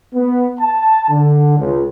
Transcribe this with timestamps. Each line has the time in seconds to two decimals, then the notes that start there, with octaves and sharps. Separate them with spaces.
0.15 B3
0.60 A5
1.10 D3
1.59 C#2